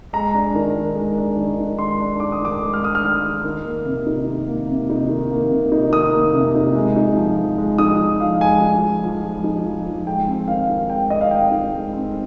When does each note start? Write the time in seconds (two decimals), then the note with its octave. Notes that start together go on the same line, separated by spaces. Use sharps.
0.13 G#3 A#5
0.34 D4
0.55 D#3
0.75 D#3
0.95 G#3
1.17 D4
1.37 D#3
1.58 D#3
1.79 G#3 C6
2.00 D4
2.20 D#3 D6
2.32 D#6
2.41 D#3 D6
2.61 G#3
2.73 F6
2.82 D4 D#6
2.95 F6
3.02 D#3
3.24 D#3
3.44 D#3
3.65 A#3
3.85 C3
4.06 D#4
4.27 D#3
4.48 A#3
4.68 C3
4.90 D#4
5.10 D#3
5.31 A#3
5.51 C3
5.72 D#4
5.92 D#3 D#6
6.13 A#3
6.34 C3
6.55 D#4
6.75 G#3
6.96 D#4
7.17 F3
7.38 F3
7.58 G#3
7.78 D#4 D#6
8.00 F3
8.20 F3 F5
8.41 G#3 G#5
8.61 D#4
8.82 F3
9.04 F3
9.24 G#3
9.44 D#4
9.65 F3
9.85 F3
10.07 G#3 G5
10.27 C4
10.48 D#3 F5
10.69 D#4
10.90 G#3 G5
11.10 C4 D#5
11.21 F5
11.31 D#3 G5
11.52 D#4
11.72 G#3
11.93 C4